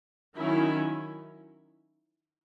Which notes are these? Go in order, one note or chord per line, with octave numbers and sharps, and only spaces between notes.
D#3 F#3 C#4 E4